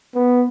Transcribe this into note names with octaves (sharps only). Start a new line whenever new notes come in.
B3